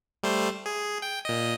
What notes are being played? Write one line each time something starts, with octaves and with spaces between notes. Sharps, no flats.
G3 A3 C5
G#4
G5
A#2 D#5